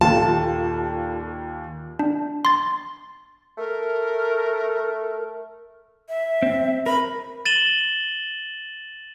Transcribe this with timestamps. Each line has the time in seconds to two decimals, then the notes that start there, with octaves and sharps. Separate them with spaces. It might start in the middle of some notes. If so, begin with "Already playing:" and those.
0.01 D#2 A#2 F4 G4 A4 A5
1.99 D4
2.45 C6 A6
3.57 A3 A#4
6.09 E5
6.42 C4
6.86 A#4 B5
7.45 A6 D#7 E7 F#7 G7